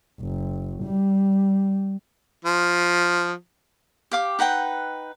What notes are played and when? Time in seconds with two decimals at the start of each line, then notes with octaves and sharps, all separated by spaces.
0.21 F#1
0.84 G3
2.44 F3
4.11 G4 F5 D6
4.39 D#4 B4 F#5 G5